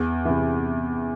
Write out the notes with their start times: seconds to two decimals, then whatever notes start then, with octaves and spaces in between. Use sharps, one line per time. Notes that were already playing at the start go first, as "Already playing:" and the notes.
Already playing: E2
0.25 C3 E3